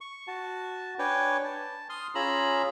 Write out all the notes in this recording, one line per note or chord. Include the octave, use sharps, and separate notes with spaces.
C#6
F#4 A5
D4 B4 C#5 G5 G#5
A5
C6 D#6 F6
C#4 F4 G#4 A#5 B5 E6